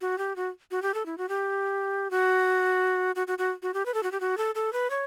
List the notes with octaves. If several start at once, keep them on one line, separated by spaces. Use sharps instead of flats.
F#4
G4
F#4
F#4
G4
A4
E4
F#4
G4
F#4
F#4
F#4
F#4
F#4
G4
B4
A4
F#4
G4
F#4
A4
A4
B4
C#5